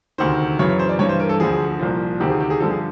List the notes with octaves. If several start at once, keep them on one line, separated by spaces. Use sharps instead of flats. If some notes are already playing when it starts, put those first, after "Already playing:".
D2 C3 D#3 C5
F#2 C#3 E3 C#5
C#5
C5
D5
G2 E3 C#5
C5
A#4
A4
D2 D3 F3 G#4
C2 A#2 F3
D2 C3 D#3 G4
G#4
G4
G#4
G2 D3 F3 A4
G#4